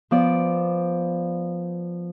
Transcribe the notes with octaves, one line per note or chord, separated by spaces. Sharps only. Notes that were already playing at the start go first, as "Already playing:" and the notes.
F3 B3 D5